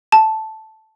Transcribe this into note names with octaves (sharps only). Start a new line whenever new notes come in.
A5